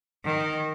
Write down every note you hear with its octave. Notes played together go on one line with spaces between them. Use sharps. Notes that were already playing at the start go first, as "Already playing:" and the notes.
D#3